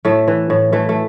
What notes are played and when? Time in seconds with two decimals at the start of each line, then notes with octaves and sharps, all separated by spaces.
0.05 A2 A3
0.28 E3
0.50 A2
0.72 E3 A3
0.89 A3